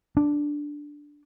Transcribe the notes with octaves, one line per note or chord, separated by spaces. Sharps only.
D4